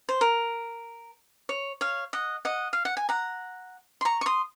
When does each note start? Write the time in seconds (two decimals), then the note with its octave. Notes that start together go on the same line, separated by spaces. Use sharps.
0.09 C5
0.21 A#4
1.49 C#5
1.81 C#5 F5
2.13 D#5 F#5
2.45 D#5 F#5
2.73 F5
2.85 F#5
2.97 G#5
3.09 F#5 A#5
4.01 C6
4.05 A#5 C#6
4.21 C#6
4.26 C6 D#6